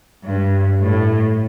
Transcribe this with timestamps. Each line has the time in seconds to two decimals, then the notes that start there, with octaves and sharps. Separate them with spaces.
0.24 G2
0.80 A2